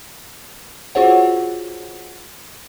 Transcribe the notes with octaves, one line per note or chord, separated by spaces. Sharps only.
F4 F#4 G#4 C5 C#5 F#5